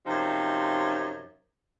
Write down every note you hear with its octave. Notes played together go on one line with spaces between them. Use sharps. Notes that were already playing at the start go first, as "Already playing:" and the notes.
F#2 C3 F3 D#4